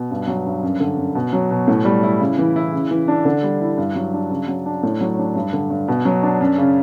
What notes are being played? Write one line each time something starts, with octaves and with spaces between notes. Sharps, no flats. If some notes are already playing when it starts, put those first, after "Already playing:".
Already playing: B2
G2
F#3
G2
F#2
D3
F#2
B2
F#3
B2
A2
G3
E4
C#3
E3
E4
C#3
E3
D4
D3
G3
E4
G2
F#3
D4
C#3
F#3
D4
A2
F#3
D4
G2
D3
G2
B2
F#3
D4
F#2
C#3